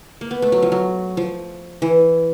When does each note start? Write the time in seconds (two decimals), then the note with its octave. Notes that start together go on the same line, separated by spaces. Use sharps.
0.21 A#3
0.31 B3
0.42 A3
0.52 F#3
0.62 F3
0.72 F#3
1.17 F3
1.82 E3